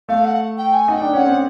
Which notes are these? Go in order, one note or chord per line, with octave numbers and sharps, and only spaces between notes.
A3 F5
F#5
G5
G#5
D#4 F#5
G5
D4
C#4 F#5
C4